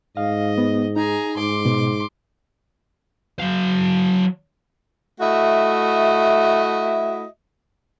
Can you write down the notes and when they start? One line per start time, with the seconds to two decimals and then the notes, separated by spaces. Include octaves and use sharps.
0.17 G#2 D#5 F5
0.58 B3
0.96 D#4 G#4 A#5
1.36 G#2 C6 D6
1.66 B2
3.39 F#3 F5
5.20 A3 E4 F#4 D#5 E5